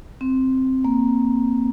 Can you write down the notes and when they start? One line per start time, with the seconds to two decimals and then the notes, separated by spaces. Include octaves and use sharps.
0.21 C4
0.85 A#3